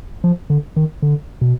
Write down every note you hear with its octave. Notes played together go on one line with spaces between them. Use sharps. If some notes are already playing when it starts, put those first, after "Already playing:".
F3
D3
D#3
D3
B2